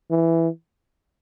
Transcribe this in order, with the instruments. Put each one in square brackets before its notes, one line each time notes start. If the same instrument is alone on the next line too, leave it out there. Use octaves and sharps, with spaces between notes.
[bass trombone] E3